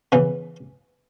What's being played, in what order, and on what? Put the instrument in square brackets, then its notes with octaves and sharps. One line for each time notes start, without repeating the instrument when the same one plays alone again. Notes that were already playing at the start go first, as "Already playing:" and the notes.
[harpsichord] C#3 E3 B3